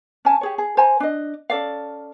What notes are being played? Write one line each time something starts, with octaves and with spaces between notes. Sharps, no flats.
C#4 G#5 A5
G4 G#4 C#5
G#4
C5 G#5 A#5
D4 D#5
C#4 A4 D5 F5